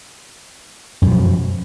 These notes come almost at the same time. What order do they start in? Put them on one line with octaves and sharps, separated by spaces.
F#2 B2 F3